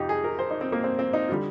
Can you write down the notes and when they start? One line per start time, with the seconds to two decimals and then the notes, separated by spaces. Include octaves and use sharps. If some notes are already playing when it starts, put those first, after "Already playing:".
Already playing: F2 C3 D#4 F4 G4
0.09 G#4
0.24 A#4
0.39 C5
0.51 D#4
0.61 C4
0.72 A#3
0.84 C4
0.99 C4
1.13 D#4
1.28 F4
1.31 D3 G3